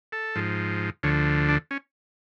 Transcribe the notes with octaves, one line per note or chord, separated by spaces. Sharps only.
A4
G#2 F3
D2 D3 F3 C#5
D4
C#4